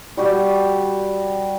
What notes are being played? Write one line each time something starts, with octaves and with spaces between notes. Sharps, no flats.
G3 F#4 G4